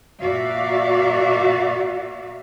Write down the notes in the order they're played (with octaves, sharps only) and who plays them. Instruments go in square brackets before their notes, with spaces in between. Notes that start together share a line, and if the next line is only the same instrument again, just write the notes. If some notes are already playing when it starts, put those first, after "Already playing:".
[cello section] A#2 A#3 F#4 D5 E5 F5